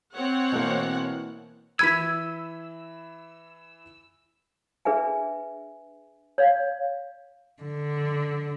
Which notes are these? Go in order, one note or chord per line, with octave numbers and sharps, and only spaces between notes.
C4 C#5 F#5
B2 E3 A#3
E3 B5 E6 G#6 B6 D#7
D4 G#4 B4 E5 G#5
C#5 D5 F5
D3